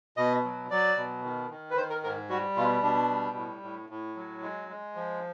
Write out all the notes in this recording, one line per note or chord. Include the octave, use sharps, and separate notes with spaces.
B2 D#5
F#3
F#3 D5
B2
D#3
D#3
B4
D#3 C5
A#4
G#2 A#4
G3 F#4
B2 F4
B2 D4
G3
A2
A2
A2
F#3
G#3
G#3
F3